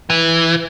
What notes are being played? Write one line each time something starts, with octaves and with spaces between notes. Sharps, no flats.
E3